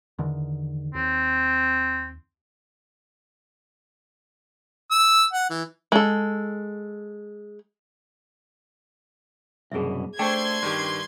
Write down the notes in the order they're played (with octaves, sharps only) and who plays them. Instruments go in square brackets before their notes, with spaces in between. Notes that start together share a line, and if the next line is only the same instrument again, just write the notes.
[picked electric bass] E2 D3 D#3
[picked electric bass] D#2 [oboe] C4
[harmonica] E6
F#5
E3
[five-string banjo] G#3 A4
[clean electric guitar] C2 F#2 B2 [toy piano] G#4 E5
[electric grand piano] A3 C5 [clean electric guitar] D4 [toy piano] G5 A5 C#6 [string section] C6 G#6
[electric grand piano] G2 D#3 G4